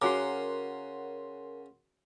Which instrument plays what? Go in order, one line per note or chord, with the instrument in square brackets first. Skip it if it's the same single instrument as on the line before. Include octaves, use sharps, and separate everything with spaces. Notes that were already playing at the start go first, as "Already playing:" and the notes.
[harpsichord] C#3 [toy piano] F#4 G#5 D6 [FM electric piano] A#4 F#5 C6